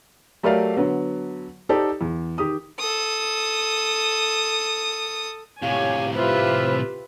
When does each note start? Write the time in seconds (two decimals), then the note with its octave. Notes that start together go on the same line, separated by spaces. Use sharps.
0.43 F#3 A3 G4 A#4 D5 F5
0.76 D3 F#3 B3
1.69 D#4 G4 A4 C5 D5
2.01 E2
2.38 D#3 G4 D#6
2.79 A4 D#6
5.62 A2 C3 G4 C#5 F5 G#5
6.15 F4 G4 B4 C5 E5